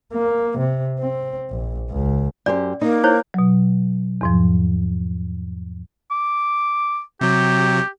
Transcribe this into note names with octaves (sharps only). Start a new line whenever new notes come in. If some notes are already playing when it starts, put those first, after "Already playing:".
A#3
C3
C4
A#1
C#2
F#2 G4 C5 D5
A#3 D#4
E4 C5 C#5
B2 F#3
E2 G#2 F3
D6
C3 F#3 G4